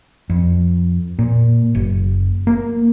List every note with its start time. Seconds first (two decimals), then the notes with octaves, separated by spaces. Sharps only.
0.30 F2
1.19 A#2
1.75 F#1
2.47 A#3